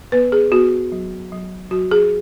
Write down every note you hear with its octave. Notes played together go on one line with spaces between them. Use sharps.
B3 B4
G#4
B3 F#4
F#3
F#3
F#3 F#4
G#4